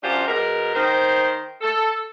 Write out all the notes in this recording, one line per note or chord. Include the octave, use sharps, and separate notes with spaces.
F#2 D4 F4 G4 C5
B2 G#3 A#4
D#3 A#4 C5
A4